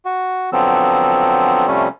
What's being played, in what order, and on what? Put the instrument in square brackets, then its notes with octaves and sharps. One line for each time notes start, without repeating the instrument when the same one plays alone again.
[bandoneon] F#4
D3 F3 F#3 B3 C4 E6
C3 F3 G3 A3 C#4